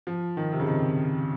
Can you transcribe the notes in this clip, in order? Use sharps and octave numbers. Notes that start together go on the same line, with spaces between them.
F3
D#3
C3
C#3
D#3